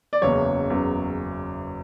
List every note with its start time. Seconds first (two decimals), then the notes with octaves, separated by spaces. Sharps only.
0.13 D5
0.21 F#1 E2 C#3 F#3 C#5
0.69 F#1 E2 C#3 F#3